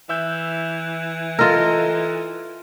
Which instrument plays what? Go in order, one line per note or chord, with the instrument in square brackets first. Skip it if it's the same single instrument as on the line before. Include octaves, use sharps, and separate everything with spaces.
[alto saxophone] E3 [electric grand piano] E5 E6 G6
[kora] F4 A#4 [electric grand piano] A4 D#5 E6